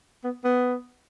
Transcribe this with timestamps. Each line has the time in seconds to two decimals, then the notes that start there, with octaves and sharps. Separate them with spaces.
0.24 B3
0.44 B3